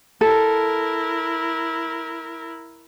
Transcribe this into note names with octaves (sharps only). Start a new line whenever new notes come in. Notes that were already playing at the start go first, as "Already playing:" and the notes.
E4 A4 A#4